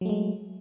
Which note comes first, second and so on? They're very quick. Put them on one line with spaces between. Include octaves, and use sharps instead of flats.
F#3 A3 G#3